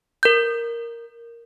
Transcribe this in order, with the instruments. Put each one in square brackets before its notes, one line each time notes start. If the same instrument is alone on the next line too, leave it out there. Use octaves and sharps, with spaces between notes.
[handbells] A#4 G6